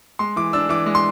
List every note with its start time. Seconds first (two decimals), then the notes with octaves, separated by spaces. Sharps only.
0.19 G#3 C6
0.36 E3 D6
0.53 D4 E6
0.69 E3 D6
0.86 G#3
0.95 C6